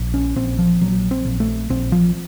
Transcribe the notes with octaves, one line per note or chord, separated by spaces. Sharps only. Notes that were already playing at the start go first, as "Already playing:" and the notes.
Already playing: A#1
C#4
A#1 C4
F3
A#1 F#3
C4
A#1
A3
A#1 C4
F3